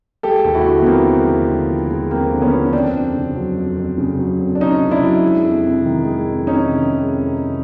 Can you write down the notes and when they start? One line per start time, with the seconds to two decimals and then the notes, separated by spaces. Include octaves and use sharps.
0.23 G#3 G4 A4
0.44 D#2
0.55 E4 F#4
0.66 D3
0.82 B3
0.86 F3 A#3 C4
1.07 G#3
1.28 D#2
1.49 D3
1.69 F3
1.91 G#3
2.11 D#2 A#3 C4
2.32 D3
2.42 B3 C#4
2.53 F3
2.66 C#4
2.73 F2 C4 D4
2.95 F2
3.15 C#3
3.35 F#3
3.57 F2
3.78 F2
3.98 C#3
4.19 F#3
4.40 F2
4.55 D4
4.61 F2 C#4 D#4
4.82 C#3
4.91 D4 E4
5.02 F#3
5.23 G#3
5.44 F2
5.65 C3
5.85 D#3
6.06 G#3
6.27 F2
6.47 C3 C#4 D#4
6.68 D#3
6.90 G#3
7.10 F2
7.31 C3